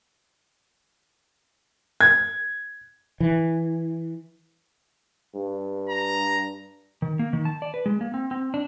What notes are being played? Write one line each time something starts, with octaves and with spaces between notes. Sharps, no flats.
G#6
E3
G2
A#5
D#3
A#3
D#3
A5
D5
B4
G#3
A#3
C4
C4
D4